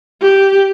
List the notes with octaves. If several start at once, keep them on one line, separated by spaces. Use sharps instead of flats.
G4